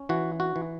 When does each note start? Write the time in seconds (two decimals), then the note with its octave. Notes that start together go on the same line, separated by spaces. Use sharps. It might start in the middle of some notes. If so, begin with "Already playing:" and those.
Already playing: C#4
0.09 E3 F#4
0.40 F#4
0.56 E3